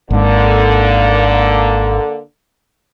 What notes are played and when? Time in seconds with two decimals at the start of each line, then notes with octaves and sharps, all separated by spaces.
0.10 G#1 G#2 D3 A#3